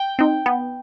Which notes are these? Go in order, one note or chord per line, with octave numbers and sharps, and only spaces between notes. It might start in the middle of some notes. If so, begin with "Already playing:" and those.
Already playing: G5
C4 D#4
B3